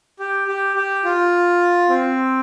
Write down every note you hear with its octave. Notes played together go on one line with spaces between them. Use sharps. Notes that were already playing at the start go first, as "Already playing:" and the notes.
G4
G4
G4
F4
C4